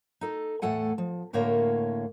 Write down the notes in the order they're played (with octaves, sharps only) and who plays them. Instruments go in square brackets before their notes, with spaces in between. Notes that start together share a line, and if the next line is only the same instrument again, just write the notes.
[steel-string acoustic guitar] D#4 A4
E2 A2 A3 A4 F#5 G#5
F3
D2 A2 D3 A#3 A#4 C#5